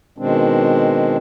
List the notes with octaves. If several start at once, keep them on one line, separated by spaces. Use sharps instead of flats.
B2 D#3 G#3 C4 D4